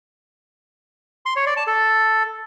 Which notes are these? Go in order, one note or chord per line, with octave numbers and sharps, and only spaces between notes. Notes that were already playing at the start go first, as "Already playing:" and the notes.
C6
C#5
D5
A5
A4